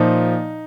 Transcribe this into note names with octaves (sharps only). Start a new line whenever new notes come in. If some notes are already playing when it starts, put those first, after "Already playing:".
Already playing: A#2 F3 D#4